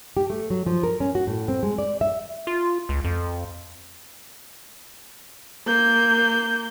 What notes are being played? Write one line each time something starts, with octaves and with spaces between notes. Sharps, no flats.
G4
A3
F#3
F3
A#4
C#4
F#4
A2
C4
G#3
D5
E5
F4
C#2
F2
A#3 G6